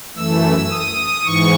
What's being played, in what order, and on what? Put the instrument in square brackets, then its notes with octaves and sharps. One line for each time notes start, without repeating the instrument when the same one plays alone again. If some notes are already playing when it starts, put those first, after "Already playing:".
[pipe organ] F#2 E3 A3 E6
D#6
G#2 E3 C#6